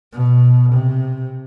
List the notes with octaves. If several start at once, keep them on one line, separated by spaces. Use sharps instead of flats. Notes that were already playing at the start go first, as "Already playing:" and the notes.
B2
C3